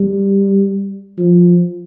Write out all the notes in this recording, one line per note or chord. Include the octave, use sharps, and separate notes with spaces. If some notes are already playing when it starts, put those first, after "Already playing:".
Already playing: G3
F3